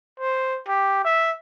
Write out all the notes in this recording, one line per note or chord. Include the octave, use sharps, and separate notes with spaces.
C5
G4
E5